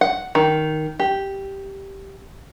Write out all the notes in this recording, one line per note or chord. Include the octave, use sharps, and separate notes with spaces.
F#5
D#3
G4